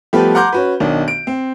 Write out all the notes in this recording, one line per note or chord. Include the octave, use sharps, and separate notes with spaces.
F3 G3 A3 B3 G4 B4
F#5 A#5 C6 D6 G6
C#4 F#4 B4
B1 D#3 D4
D7
C4